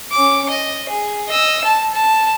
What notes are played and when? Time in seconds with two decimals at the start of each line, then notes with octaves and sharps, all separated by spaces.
0.12 C#4 D6
0.50 D#5
0.89 G#4
1.28 D#5 E6
1.64 A5
1.93 A5